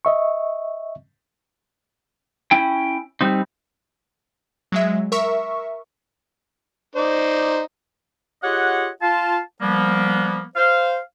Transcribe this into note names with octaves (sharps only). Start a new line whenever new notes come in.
D#5 E5 C#6
C#4 E4 G5
G3 C4 D#4
F#3 G#3 E5
A#4 E5 C#6
D#4 C5 D5
F4 G4 G#4 C#5 D#5 F#5
F4 F5 A5
F3 G3 A#3 B3
C5 F5